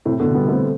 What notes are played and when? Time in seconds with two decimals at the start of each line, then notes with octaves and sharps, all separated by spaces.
0.05 A2 C3
0.20 B2 D3
0.34 G3 B3
0.48 A3 C4